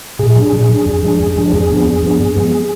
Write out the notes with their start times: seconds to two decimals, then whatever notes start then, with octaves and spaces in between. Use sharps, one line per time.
0.19 A#2 G#4
0.36 F#3 D4
0.52 A#2
0.69 F#3 D4
0.86 F2
1.03 F3 G#3 D4
1.20 F2
1.36 F3 G#3 D4
1.52 F2 G#4
1.69 F3 B3 D4
1.85 F2
2.03 F3 B3 D4
2.19 F#2
2.35 F3 G#3 B3